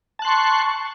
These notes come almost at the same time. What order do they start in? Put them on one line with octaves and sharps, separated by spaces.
A5 F#6 C6 C#6